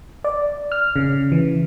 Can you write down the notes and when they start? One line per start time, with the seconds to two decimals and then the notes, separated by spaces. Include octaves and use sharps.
0.24 D5
0.72 F6
0.96 C#3
1.32 E3